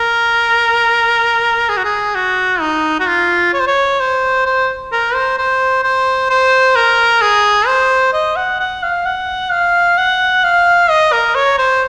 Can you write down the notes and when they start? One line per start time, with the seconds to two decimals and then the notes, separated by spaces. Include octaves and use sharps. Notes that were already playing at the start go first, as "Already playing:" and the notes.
Already playing: A#4
1.69 G#4
1.77 F#4
1.85 G#4
2.15 F#4
2.61 D#4
3.00 F#4
3.07 F4
3.53 C#5
3.60 C5
3.67 C#5
4.00 C5
4.46 C5
4.92 A#4
5.14 C5
5.38 C5
5.83 C5
6.30 C5
6.76 A#4
7.21 G#4
7.67 C5
8.13 D#5
8.36 F#5
8.60 F#5
8.83 F5
9.05 F#5
9.52 F5
9.98 F#5
10.44 F5
10.90 D#5
11.13 A#4
11.35 C#5
11.58 C5